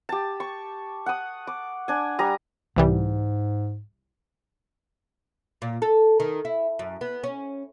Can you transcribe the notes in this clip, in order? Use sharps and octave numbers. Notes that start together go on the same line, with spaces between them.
G4 A5
C#6
F#5 D#6
D6
D4 G#5
G3 A#5 D#6
C2 G#2 E3 G3
A#2
A4
D#3
E4
F#2
B3
C#4